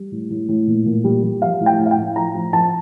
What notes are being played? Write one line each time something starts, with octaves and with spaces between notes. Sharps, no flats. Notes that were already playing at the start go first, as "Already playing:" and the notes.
Already playing: G3
A2
A2
A2
A#2
A#2
G3
G3
F3 F5
A2
G5
A2
F5
G5
A2
F3 A#5
F3
F3 A5